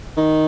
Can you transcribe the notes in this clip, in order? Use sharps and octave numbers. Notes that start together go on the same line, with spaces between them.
D#3